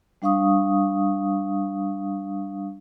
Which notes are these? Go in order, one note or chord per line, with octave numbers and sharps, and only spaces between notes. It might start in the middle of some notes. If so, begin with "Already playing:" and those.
G3 D4 F5 C#6 D#6